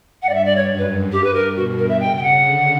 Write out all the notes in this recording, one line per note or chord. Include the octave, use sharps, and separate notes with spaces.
G2 F#5
D5
E5
D5
C#5
F#2
B4
G2 G4
B4
A#4
B2 F#4
A#4
E5
C#3 G5
G5
F#5
D3